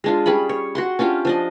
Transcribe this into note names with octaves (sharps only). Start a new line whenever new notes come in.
G#3 D4 F4
G3 C#4 G#4 B5
C#5
F#4 F#5 C6
C#4 D4 F4 G4
F3 D4 D#5